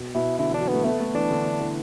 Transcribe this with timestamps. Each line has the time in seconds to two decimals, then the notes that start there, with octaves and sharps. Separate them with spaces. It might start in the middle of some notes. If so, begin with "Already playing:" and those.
Already playing: B2
0.15 B2 E4
0.39 D3 E4
0.50 E3 D4
0.61 F#3
0.68 A3 B3
0.84 A3 B3
1.00 A3
1.14 E3 D4
1.31 D3
1.45 D3
1.60 E3